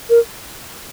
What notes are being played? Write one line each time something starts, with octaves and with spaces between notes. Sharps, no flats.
A#4